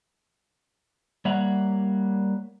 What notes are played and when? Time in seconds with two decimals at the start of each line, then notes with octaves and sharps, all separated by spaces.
1.25 G3 A#3 C#5 E5 F#5 A#5